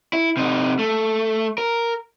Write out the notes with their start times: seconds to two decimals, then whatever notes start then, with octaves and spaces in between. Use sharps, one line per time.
0.13 E4
0.37 C3 D#4
0.79 A3
1.58 A#4